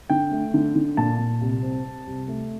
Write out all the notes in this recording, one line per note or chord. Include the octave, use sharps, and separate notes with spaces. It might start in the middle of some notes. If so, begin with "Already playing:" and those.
D3 G5
A3
D3
D3
A#2 A5
A#2
C2
C4
C4
C2
A3